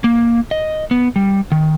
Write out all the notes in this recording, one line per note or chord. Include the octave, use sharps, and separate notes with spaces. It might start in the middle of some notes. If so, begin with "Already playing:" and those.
A#3
D#5
B3
G3
D#3